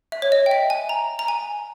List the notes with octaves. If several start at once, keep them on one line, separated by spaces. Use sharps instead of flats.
E5
C#5
D#5
G5
E5
G#5
A#5
A#5
G#5